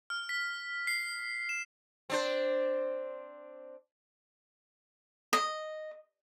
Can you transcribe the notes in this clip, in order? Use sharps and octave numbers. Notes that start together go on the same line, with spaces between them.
F6
B6
C7
E7
C4 D4 C5
D#5